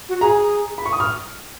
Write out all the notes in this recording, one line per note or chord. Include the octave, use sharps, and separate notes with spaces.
F#4
G#4 A#5
B5
C#6
D#6
F6